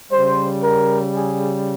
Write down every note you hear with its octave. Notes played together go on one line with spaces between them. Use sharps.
C#3 G3 C5
A#4
G#4